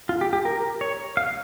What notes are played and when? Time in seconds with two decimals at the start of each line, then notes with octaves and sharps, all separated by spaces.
0.09 F4
0.21 G4
0.33 G4
0.45 A#4
0.81 C#5
1.17 F5